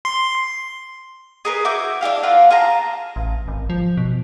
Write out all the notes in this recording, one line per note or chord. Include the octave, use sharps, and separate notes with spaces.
C6
G#4 A#4 B4
E4 F#4 D6 G6
D4 E4 G4 F5
A#3 F4 F#5
F4 G#4 A5 A#5
A1
G#1
F3
B2